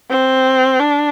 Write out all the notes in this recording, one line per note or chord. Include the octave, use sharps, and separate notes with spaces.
C4
D4